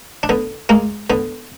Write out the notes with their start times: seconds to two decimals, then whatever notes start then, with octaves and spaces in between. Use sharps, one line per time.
0.23 D4
0.29 D3 B3
0.69 G#3 A#3
1.10 D3 B3